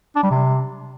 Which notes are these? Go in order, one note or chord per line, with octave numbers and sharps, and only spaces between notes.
D4
G3
C3